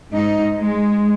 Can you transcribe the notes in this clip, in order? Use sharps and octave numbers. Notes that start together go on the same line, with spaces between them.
G#2 D#4
G#3